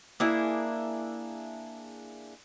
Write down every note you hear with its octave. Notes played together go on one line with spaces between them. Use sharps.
A#3 D4 E4 G#4